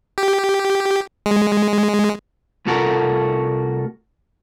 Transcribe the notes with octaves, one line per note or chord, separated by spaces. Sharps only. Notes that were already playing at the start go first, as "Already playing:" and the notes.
G4
G#3
C2 A3 F4 F#4 A4 A#4